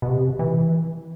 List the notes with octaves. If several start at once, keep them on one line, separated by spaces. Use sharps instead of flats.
B2
C3
E3